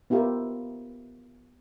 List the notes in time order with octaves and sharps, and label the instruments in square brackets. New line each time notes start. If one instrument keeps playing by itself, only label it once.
[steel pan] B3 E4 F4 G4 A#4